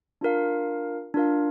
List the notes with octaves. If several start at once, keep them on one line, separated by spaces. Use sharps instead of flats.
D4 F4 A#4 F5
D4 F4 A#4 F5